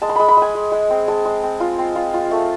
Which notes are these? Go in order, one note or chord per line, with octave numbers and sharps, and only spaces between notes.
G#3 A5
C6
G#3 B5
B5
G#3
G#5
G#3
G#3
C4
G#3 A5
G#3
C4
F4
C4
F4
F4
A3